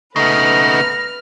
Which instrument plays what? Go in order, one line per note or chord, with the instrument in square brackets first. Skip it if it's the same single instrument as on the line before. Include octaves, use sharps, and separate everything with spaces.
[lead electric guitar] C#3 B3 [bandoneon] A3 D#4 [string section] B4 F6 [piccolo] A#6